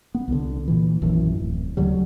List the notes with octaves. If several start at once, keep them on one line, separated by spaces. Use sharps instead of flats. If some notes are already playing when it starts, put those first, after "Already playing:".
B3
C2 D3
A#2 E3
A#1 F#2 D#3 E3
D1
D2 D3 F#3 G3